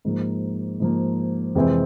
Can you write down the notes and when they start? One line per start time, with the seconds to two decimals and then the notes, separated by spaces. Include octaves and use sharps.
0.05 G#2 F3 A#3
0.80 G#2 F3 A#3
1.55 F2 C3 E3 G#3 C4